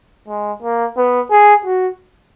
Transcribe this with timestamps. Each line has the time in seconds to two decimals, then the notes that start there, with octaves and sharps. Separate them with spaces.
0.28 G#3
0.63 A#3
0.97 B3
1.31 G#4
1.65 F#4